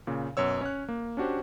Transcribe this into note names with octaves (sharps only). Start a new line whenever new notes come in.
A#2 C#3
F#2 B2 C#5 E6
C#4 C#5 F#6
A#3
C#4 D4 F#4 G4 C5